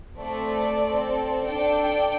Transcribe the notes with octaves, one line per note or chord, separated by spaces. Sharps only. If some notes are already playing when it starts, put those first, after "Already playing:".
A3 C4 A4 D5
C4 A4
D4 A4 D5 G5